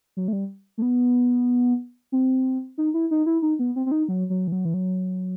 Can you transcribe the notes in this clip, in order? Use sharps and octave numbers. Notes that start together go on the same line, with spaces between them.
F#3
A3
G3
A3
B3
C4
D#4
E4
D#4
E4
D#4
B3
C4
C4
D#4
F#3
F#3
E3
F#3
E3
F#3